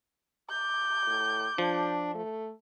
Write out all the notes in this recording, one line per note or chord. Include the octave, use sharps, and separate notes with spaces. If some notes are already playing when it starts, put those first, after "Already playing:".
D6 G6
A2
F3 D4
A3